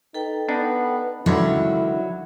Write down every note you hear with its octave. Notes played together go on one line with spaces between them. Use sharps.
D#4 A4 B4 G5
B3 D4 D#4
C#2 D3 D#3 F#3 E4 F#5 B5